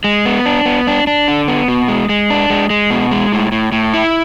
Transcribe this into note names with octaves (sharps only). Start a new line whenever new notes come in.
G#3
B3
D4
B3
D4
D4
D3
B3
B2
G#3
G#3
D4
G#3
G#3
B2
G#3
A2
A2
A2
E4